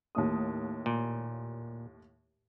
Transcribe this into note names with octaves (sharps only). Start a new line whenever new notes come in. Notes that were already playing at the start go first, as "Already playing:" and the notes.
D#2 A2 D#6
A#2